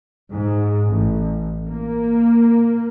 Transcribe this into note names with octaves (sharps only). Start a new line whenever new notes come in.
G#2
A1
A#3